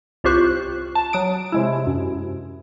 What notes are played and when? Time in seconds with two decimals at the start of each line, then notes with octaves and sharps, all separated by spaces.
0.24 C2 F4 G4 C5 C#6 F#6
0.95 A5
1.13 F#3 D#6 D7
1.52 C3 G#3 E4
1.87 F#2